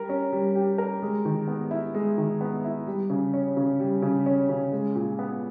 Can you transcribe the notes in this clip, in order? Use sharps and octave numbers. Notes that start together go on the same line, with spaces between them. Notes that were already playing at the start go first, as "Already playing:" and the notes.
Already playing: G3 A#4
C#4
G3
G4
A#4
G#3
D#3
B3
E4
G#3
D#3
B3
E4
G3
C#3
C#4
C#3
G3
C#3
C#4
C#3
G#3
A#2
B3